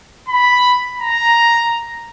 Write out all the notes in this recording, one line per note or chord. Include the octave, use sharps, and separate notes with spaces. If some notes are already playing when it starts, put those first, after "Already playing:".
B5
A#5